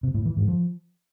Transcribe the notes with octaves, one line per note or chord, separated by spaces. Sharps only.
C3
A2
E3
G#2
F3